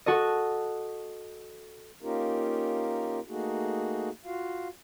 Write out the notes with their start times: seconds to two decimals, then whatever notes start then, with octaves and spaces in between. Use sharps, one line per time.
0.06 F#4 A4 D#5
2.02 A#3 C#4 D#4 F4 G4 A#4
3.28 A3 A#3 D#4 F#4 G#4
4.25 F4 F#4 F5